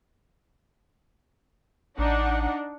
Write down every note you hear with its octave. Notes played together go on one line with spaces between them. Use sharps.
A1 D4 D#4 F#5